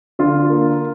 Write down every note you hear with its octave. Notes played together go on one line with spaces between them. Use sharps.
D3 F4
A#3